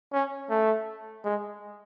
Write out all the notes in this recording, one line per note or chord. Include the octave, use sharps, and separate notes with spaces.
C#4
A3
G#3